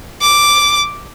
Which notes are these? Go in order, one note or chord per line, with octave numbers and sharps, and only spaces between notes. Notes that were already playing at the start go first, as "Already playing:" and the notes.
D6